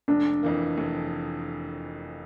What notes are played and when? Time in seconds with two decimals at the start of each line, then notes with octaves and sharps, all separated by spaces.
0.08 F1 D4
0.43 F2 E3 A#3
0.78 F1